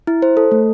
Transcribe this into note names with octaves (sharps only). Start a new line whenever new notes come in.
E4
C5
A4
A3